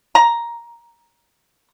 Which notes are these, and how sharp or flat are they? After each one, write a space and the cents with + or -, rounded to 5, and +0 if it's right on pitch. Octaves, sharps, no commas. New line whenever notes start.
A#5 +10